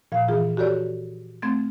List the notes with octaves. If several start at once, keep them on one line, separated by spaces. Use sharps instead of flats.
A#2 F3 F5
E3 F4 G#4
F#4 G4 A4 C#5 D5
A3 C4 G#6 A6